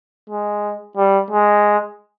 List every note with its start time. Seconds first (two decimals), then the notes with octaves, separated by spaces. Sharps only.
0.30 G#3
0.97 G3
1.31 G#3